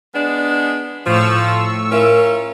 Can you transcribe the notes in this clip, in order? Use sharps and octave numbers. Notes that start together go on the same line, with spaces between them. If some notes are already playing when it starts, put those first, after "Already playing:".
G#3 B3 D4
A2 F3 C#6 E6
C#4 E4 F4 A#4